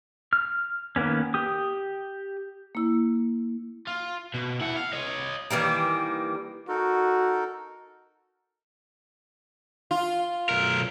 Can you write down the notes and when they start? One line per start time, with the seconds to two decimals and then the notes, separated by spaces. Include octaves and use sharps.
0.33 F6
0.96 D#3 A#3 B3 C#4
1.34 G4 D#6
2.75 A#3 E4
3.87 F4
4.34 B2
4.61 E4 F#5
4.76 F5
4.93 C#5 D#5
5.50 D#3 E3 G3 A#3
6.68 D#4 F#4 A4 A#4
9.91 F4
10.49 B1 A#4